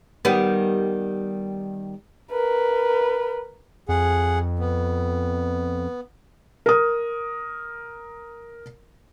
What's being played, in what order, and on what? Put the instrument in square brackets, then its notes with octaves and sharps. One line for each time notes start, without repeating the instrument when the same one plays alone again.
[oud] D#3 G3 B3
[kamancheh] A#4 B4
[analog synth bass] F2 [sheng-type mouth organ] G#4 F#5
[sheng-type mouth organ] B3
[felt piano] A#4 D#6